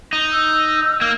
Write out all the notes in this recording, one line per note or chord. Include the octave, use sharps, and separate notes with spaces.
D#4
E6
A#3